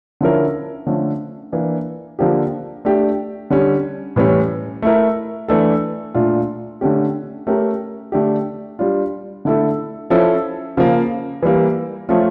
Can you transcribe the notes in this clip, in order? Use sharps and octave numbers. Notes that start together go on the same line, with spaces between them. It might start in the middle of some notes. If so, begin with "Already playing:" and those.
D3 F3 C#4 E4 A#4
D3 F3 A3 C#4
E3 A#3 D4
D3 F3 A#3 D4 G4
A3 D4 G4
D3 G3 C#4
A2 E3 G3 C#4
A3 E4 A#4
E3 A3 D4 A4
A#2 A3 D4 F4
D3 A3 C#4 G4
A3 C#4 G4 A#4
D3 A3 D4 G4
G3 D4 F4
D3 A3 E4 A4
F3 C#4 E4 A4
C#3 F3 A#3
E3 G3 A#3
F3 A3 C#4 F4